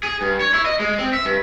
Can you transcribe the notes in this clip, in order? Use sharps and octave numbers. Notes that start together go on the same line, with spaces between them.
G#4
G2
C#5
E4
D#5
G#3
C4
E5
G2